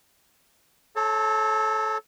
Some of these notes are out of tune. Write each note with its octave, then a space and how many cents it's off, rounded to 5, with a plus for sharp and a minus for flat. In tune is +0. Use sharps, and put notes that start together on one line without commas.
A4 -20 C#5 -25 A5 +30